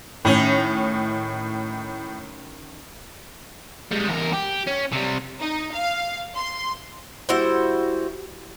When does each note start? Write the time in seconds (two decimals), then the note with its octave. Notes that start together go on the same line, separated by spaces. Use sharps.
0.25 A2 D#3 C#4
3.92 G3 G#3
4.08 E2 A#4
4.34 G4
4.67 C#4
4.93 C3 G3
5.41 D#4
5.73 F5
6.36 C6
7.29 G3 E4 F#4 C5